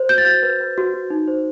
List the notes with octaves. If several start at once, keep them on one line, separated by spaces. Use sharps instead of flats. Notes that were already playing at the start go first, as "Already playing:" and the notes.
Already playing: C5
F#4 G6
A6
F#4 G6
B4
B4
F#4
F#4
D#4
C5